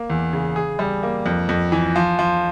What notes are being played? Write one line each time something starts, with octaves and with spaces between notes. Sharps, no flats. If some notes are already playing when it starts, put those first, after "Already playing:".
Already playing: A#3
E2
C#3
G#4
G3
A#3
F2
F2
E3
F3
F3